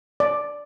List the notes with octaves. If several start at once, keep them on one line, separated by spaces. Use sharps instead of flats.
D5